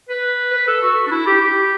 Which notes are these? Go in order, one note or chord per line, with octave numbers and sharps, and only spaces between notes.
B4
B4
A4
F#4
D4
E4
G4
G4